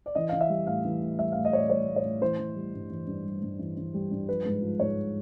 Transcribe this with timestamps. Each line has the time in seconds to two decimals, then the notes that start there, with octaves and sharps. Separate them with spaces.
0.06 D5
0.15 E3 D#5
0.29 E3 F5
0.41 E5
0.50 G3
0.67 A2 F5
0.85 E3
1.01 A2
1.18 G3 E5
1.32 F5
1.35 A2
1.45 D#5
1.52 A2 C#5
1.57 D5
1.70 G3 C#5
1.87 A2
1.96 C#5
2.04 A2
2.21 E3 C5
2.38 E3
2.56 G3
2.74 G2
2.90 E3
3.07 G2
3.26 G3
3.42 G2
3.59 E3
3.77 E3
3.94 G3
4.11 G2
4.29 F3 B4
4.45 G#2
4.62 F3
4.80 G#2 C#5